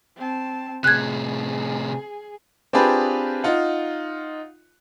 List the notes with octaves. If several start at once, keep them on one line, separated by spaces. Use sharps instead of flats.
C4 A5
A2 C3 G#4 F#6 G#6
C4 D4 F4 G4 G#4 B4
D#4 F4 F#5